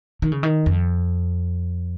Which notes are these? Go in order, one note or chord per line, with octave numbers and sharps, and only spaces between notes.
D#3
C#3
D#3
F2